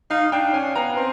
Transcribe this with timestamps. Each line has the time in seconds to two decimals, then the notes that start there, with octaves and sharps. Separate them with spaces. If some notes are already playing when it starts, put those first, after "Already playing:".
0.10 D#4 F5
0.32 D4 G5
0.54 C#4 G#5
0.75 B3 A#5
0.97 C4 C6